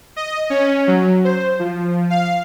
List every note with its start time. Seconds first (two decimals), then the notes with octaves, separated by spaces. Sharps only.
0.16 D#5
0.50 C#4
0.87 F#3
1.25 C5
1.59 F3
2.10 F5